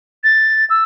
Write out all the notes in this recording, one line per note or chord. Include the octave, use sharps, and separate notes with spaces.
A6
E6